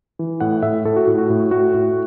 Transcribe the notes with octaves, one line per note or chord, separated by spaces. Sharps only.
E3
A2 F#5
A2 E5
A2 A4
F#4
A2
F#4
A2
A2 F#4
A2